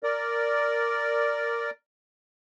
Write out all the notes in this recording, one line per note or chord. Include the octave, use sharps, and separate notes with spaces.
A#4 D5